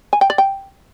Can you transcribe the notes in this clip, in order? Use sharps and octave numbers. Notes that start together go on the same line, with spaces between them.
G#5
G5
D5
G5